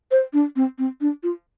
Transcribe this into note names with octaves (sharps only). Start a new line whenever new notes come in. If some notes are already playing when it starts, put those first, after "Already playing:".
C5
D4
C4
C4
D4
F4